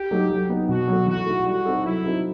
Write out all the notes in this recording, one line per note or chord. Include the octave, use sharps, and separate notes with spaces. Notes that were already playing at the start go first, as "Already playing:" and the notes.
Already playing: G4
F#3 A3 D#4
F#3
B3 D#4
B2 F#4
F#3 A3
E3 F#4
A3 E4
G3 F#4
C4 D#4 A4
F#3 E4
C4 D#4 F#4 A4